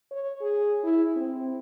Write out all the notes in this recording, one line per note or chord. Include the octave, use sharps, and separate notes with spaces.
C#5
G#4
E4
C4